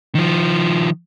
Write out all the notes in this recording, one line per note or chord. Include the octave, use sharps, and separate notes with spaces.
D#3 F3